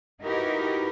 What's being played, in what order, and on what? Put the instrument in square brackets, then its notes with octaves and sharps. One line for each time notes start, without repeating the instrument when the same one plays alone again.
[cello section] D#4 E4 F#4 G4 A#4 B4